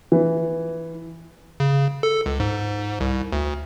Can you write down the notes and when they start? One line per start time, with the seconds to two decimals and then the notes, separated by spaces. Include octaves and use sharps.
0.12 E3
1.60 C#3
2.03 A4
2.26 C#2
2.40 G#2
3.01 C2
3.33 D2